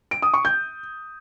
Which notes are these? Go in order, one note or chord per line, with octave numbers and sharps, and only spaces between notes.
D7
D#6
C#6
G6